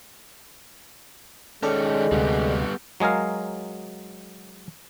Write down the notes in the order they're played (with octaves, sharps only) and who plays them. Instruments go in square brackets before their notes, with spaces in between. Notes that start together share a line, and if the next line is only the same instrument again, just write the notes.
[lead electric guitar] D#3 C#4 [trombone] G#3 [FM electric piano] A4 D5
[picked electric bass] D2 C3 [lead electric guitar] G3 B3
[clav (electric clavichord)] F#3 G#3 G#4 A#4 F5